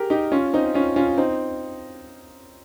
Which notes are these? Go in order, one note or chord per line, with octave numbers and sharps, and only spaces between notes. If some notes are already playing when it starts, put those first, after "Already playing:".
Already playing: G4 G#4 A#4
D#4 G4
C#4 F4
C4 D#4
C#4 F4
C#4 F4
C4 D#4